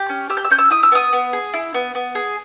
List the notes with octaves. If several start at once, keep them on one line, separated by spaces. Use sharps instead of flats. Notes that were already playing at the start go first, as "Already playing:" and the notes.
Already playing: G4 G6
C#4
G4 E6
G6
E6
C#4 G6
E6
E4 D#6
E6
B3 D#6
B3
G#4
E4
B3
B3
G#4